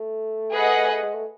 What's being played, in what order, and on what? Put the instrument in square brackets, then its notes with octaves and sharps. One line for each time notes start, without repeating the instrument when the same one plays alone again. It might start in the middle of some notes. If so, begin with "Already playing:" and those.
Already playing: [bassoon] A3
[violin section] G#4 B4 D#5 F#5
[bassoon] G#3
A3